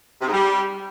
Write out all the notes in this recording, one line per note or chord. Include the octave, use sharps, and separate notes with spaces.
C3
G#2
G3